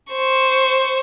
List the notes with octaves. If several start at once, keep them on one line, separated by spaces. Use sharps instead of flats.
C5 C#6